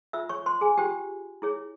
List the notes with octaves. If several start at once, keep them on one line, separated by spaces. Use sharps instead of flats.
F4 C5 E5 E6
C#5 C#6
C5 C6
G#4 G#5
F4 G4 C5 G5
E4 G#4 C#5